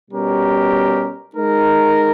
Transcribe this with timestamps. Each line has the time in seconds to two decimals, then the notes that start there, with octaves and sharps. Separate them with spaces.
0.10 B2 G3 C#4 G4 A#4
1.36 G#3 D#4 A#4